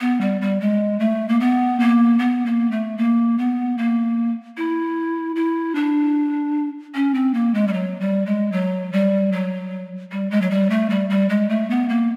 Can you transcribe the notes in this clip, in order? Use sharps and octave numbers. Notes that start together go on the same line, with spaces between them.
B3
G3
G3
G#3
A3
A#3
B3
A#3
B3
A#3
A3
A#3
B3
A#3
E4
E4
D4
C#4
C4
A#3
G#3
G3
F#3
G3
G#3
F#3
G3
F#3
G3
G#3
F#3
G3
A3
G3
G3
G#3
A3
B3
A#3